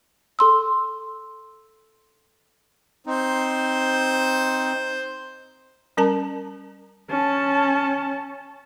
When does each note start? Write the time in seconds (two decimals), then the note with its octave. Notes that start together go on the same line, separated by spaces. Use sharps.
0.39 A4 C6 E6
3.07 C4 D#4 C5
5.97 G3 C#4 A#4 A5 A#5
7.10 C#4 A5